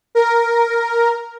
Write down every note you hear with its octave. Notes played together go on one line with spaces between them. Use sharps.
A#4